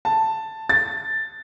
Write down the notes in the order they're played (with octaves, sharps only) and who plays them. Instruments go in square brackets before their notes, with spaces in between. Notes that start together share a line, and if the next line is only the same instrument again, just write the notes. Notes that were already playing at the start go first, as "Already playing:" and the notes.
[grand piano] A5
A6